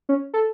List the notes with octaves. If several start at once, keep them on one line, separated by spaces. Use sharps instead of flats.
C#4
A4